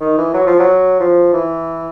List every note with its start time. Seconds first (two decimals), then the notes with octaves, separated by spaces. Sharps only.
0.01 D#3
0.18 E3
0.34 F#3
0.47 F3
0.59 F#3
1.00 F3
1.33 E3